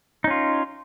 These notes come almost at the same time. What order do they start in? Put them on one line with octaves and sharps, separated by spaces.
D#4 C#4 F4